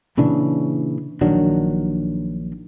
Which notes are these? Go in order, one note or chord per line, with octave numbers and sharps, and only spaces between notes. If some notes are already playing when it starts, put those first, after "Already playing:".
A#2 C#3 E3 D4
A#1 D#3 F#3 D4